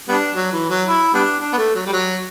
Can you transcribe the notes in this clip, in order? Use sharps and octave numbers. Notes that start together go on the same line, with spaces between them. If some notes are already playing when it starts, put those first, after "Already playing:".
G3 B3 D4
F#3
E3
F#3
E4
G3 B3 D4
D4
B3
A3
F#3
G3
F#3